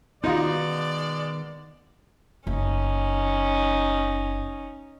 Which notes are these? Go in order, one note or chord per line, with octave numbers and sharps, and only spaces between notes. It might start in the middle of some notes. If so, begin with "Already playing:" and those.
B2 D#3 G#3 B3 D#4 F4 F#4 D5
F#1 C#4 D#4